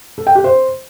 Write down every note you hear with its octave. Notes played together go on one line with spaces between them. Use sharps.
A4
G5
G4
C5